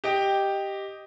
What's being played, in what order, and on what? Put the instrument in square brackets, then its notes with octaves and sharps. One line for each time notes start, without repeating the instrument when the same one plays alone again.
[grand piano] G4 D#5 G5